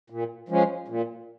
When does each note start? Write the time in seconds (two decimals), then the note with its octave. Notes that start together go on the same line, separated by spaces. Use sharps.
0.10 A#2
0.49 F3 G#3 C#4
0.88 A#2